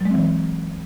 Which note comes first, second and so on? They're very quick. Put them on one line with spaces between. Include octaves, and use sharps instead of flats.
F#3 G#3 C4 E3